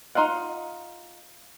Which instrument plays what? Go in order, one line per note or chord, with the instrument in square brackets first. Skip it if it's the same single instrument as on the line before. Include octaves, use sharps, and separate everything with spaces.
[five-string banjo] D#4 F4 F5 F#5